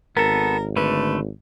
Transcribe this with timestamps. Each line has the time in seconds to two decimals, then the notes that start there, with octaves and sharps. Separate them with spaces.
0.17 G#1 B3 A4 A#4
0.77 D3 A3 B4